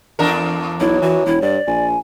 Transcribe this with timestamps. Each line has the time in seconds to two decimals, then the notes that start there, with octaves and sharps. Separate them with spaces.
0.19 E2 D4 A#4
0.80 B1 E4 C#5
1.02 E3 F#4
1.26 E1 E4
1.42 G2 D5
1.67 A#1 G#5